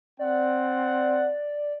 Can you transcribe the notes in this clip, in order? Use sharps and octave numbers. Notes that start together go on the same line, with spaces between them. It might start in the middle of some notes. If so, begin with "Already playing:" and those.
C4 D5 F#5